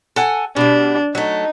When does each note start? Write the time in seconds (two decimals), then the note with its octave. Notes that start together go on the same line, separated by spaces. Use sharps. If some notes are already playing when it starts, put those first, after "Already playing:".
0.16 A4 F#5 G#5
0.56 B2 G3 D4
1.15 F#3 A3 D#4